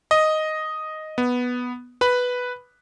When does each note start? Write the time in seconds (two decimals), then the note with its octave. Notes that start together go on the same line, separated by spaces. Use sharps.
0.11 D#5
1.18 B3
2.01 B4 B5